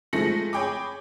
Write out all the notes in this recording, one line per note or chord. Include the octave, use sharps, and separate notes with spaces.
F3 G#3 A3 A#6 C#7 F#7
G#4 C#5 G5 B5 D6